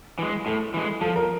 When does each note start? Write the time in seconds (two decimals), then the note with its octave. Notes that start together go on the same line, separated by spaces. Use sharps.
0.19 E3 G#3
0.46 A2 A4
0.74 E3 G#3
1.01 F3 A4
1.16 A#4